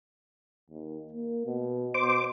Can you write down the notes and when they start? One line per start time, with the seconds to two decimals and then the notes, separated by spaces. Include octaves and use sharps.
0.70 D#2
1.13 A#3
1.47 B2
1.94 B2 C5 D6